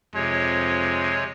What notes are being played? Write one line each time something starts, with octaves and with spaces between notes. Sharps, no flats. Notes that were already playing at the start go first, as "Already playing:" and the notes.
F2 C3 G#3 C#5